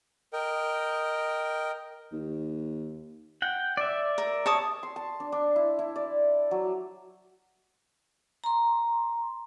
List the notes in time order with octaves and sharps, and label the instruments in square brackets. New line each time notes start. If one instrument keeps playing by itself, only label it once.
[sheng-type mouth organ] A#4 D#5 G5
[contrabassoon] D#2
[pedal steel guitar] F#5 G5
D5 E5
[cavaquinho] A#4
C#5 A5 D#6
[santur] C6
A5
D4
D4
E4
E4
D5
F#3
[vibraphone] A#5 C6